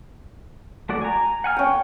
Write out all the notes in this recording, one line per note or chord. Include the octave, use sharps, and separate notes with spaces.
A3 F#4 D5
G#5 A#5
F#5 G#5 F6
C#4 F#5 G5